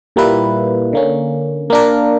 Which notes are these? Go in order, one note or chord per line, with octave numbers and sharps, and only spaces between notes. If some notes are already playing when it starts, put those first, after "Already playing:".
A#2 G3 A#3 E4 B4
D3 A#3 C#4
A#3 D4 A#4